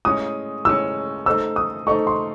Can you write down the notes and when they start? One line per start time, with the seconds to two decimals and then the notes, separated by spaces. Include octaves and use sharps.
0.05 A2 G#3 C#4 D#6
0.65 A2 G#3 C#4 E6
1.26 A3 D#4 A4 C5 E6
1.56 D#6
1.87 A3 D#4 A4 C5 C#6
2.07 C6